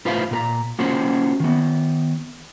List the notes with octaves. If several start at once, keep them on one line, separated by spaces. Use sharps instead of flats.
A2 F4 B4 C5 E5 F5
A#2 A#4 A#5
A#3 C#4 F4 F#4 C5
D#3 B3